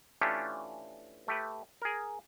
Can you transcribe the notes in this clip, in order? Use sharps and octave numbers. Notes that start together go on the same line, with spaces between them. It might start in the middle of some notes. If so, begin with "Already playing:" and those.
E3 A3 C#4 D4 F4 G4
A3 G4 B4
G#4 A#4